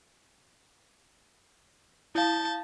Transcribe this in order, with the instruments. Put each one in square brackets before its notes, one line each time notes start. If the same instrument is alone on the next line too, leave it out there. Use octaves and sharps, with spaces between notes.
[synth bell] E4 F5 [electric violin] A5 G6